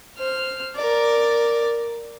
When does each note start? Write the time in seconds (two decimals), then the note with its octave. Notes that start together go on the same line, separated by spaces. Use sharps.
0.18 C5 F6
0.75 A#4 D5